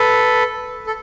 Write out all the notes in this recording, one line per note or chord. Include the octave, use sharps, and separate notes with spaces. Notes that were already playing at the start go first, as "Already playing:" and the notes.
Already playing: A4 B4
A4